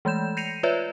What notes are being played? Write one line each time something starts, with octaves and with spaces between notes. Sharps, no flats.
E3 G#3 A3 G6 E7
G6 A#6 C7 C#7 D#7 F7
F4 B4 C#5 D5 E5